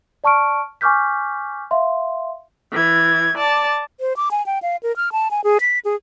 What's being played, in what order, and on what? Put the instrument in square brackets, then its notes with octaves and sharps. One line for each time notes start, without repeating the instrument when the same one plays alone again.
[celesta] D5 A5 C#6 F6 D7
G#5 C#6 D6 F6 G6 B6
E5 F5 C6
[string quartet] E3 G#6
D5 A5
[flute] C5
D6
G#5
G5
F5
A#4
F6
A5
G#5
G#4
B6
G#4